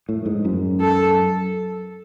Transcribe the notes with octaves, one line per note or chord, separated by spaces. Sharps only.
A2
G#2
F#2
A4